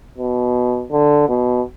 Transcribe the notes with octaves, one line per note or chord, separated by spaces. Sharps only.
B2
D3
B2